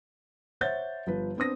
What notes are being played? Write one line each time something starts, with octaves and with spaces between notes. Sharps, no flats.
C5 C#5 E5 F#5 G6 A6
G1 F3 B4
B3 C4 D4 D#6 A#6